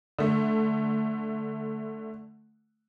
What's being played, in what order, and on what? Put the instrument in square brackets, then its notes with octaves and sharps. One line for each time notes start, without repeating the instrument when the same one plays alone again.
[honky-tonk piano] D3 A3